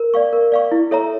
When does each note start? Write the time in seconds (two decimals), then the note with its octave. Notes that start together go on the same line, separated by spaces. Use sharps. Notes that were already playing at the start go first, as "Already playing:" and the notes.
Already playing: A#4
0.14 D5 F5 C#6
0.33 A#4
0.52 D5 F5 C#6
0.72 E4
0.91 A4 C#5 E5 A#5